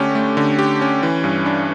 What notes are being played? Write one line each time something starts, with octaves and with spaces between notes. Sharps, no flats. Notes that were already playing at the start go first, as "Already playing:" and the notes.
Already playing: D3 A3 C#4 G4
A3
D3
G4
C#4
E3
G2
D4